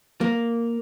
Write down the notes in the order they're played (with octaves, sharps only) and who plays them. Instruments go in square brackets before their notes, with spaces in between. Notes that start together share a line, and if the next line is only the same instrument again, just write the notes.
[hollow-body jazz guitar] A#3